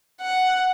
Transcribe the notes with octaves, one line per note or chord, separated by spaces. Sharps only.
F#5